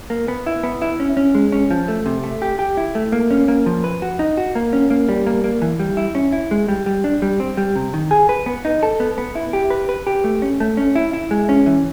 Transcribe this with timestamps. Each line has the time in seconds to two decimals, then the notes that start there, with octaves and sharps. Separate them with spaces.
0.10 A#3
0.28 B3
0.46 E4
0.63 B3
0.82 E4
1.00 C#4
1.17 C#4
1.35 G#3
1.52 C#4
1.71 F3
1.88 A3
2.06 C3
2.24 A3
2.42 G4
2.59 G4
2.77 E4
2.95 A3
3.12 A#3
3.31 C#4
3.48 A#3
3.66 F3
3.84 B4
4.02 F#4
4.19 D#4
4.37 F#4
4.55 A#3
4.73 C#4
4.90 A#3
5.09 G3
5.27 A#3
5.44 A#3
5.62 E3
5.79 G3
5.97 E4
6.15 C#4
6.33 E4
6.51 G#3
6.68 G3
6.86 G3
7.04 D4
7.22 G3
7.40 C4
7.57 G3
7.76 C3
7.94 D#3
8.11 G#4
8.29 B4
8.46 B3
8.65 D#4
8.83 A4
9.00 B3
9.18 B3
9.35 E4
9.53 G4
9.70 B4
9.89 B4
10.07 G4
10.24 A3
10.42 C#4
10.60 A3
10.77 C#4
10.95 E4
11.13 E4
11.31 G#3
11.49 C#4
11.66 E3